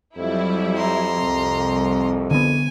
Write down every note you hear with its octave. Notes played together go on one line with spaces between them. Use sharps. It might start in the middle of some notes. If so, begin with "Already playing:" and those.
F2 F#3 G3 E4
A#5 C6
C2
D3 B3 G#5